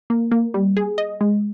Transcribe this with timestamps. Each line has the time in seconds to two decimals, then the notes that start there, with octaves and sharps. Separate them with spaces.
0.10 A#3
0.31 A#3
0.54 G3
0.77 G#4
0.98 D#5
1.21 G#3